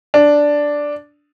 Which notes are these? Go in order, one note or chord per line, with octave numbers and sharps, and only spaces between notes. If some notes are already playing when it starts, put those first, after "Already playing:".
D4